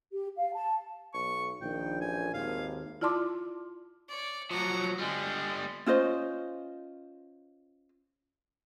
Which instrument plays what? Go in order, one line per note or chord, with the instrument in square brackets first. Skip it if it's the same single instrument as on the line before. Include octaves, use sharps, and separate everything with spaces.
[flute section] G4
F5
A5
[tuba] B1 [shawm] C#6
[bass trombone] A#1 [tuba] D#3 [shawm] G5
[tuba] A1 [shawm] G#5
[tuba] G#1 [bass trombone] D#2 [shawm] F5
[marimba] E4 F4 D5 A5 C6 D6
[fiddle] C#5 D5
[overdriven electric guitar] F3 F#3 [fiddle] F#5 A#5
[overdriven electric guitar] D3 G3 [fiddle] G#3
[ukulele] C#4 F4 C5 D#5